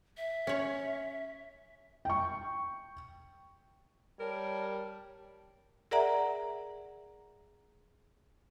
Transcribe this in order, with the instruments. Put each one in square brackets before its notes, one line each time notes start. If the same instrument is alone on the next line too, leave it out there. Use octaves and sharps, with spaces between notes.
[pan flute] E5
[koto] C#4 C#5
[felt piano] G5 C#6
[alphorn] G3 [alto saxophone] A#4 [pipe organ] C#5 A5
[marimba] G#4 A#4 D5 E5 F#5 A#5